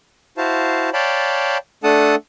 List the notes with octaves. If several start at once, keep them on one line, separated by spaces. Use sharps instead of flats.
E4 F#4 C5 F5 A5
C#5 D5 F5 G5 A5 B5
A3 D4 A4 F#5 A5 D#6